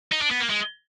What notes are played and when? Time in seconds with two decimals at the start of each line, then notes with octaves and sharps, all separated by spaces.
0.12 D#4
0.21 D4
0.31 B3
0.40 A#3
0.50 G#3